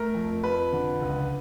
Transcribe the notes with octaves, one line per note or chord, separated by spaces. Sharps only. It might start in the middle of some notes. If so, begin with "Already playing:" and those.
Already playing: A3 A#4
F2
F2 B4
D3
C#2